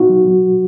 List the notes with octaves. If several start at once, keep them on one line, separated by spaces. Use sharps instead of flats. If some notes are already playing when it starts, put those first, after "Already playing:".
Already playing: B3 D#4 F#4
F#3
F#3